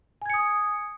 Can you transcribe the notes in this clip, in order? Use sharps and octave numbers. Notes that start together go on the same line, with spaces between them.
G#5 D#6 G#6 C#7